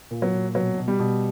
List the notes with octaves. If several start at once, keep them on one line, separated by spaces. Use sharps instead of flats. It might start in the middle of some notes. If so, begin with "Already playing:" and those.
A#2
F#3
A#2
B2 F#3
B2
G3
B2